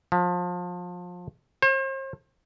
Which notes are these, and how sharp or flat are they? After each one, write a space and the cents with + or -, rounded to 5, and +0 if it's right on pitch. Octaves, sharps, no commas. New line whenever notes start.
F3 +30
C5 +40